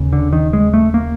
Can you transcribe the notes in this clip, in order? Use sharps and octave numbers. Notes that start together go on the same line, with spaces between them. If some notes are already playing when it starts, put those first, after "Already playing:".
Already playing: D#2 C#3
D3
D#3
G#3
A3
A#3